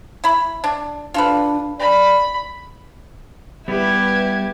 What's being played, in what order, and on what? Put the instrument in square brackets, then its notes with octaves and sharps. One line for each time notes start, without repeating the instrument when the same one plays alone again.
[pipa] E4 B5
D4
[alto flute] D4 [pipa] F4 A4 B4
[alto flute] D5 [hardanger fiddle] B5
[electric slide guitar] G3 B3 [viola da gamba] E4 [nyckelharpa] G4 [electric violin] B4 G#6